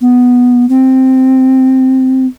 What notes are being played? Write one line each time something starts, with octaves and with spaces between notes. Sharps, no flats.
B3
C4